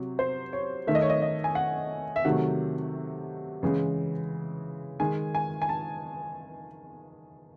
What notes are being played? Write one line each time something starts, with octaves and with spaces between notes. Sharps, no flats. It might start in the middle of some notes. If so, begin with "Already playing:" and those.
Already playing: C3 F#3
C5
C#5
D#3 A3 E5
D#5
C#5
D#5
D#5
G#5
F#5
E5
C3 D#3 F#3 A3 F#5
C#3 E3 G#3
D#3 G#3 G#5
G#5
G#5
A5